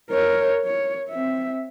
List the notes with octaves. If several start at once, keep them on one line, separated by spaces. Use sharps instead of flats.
A#4 C#5
C#5
C4 E5